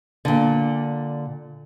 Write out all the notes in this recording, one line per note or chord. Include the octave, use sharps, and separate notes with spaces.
A#2 D3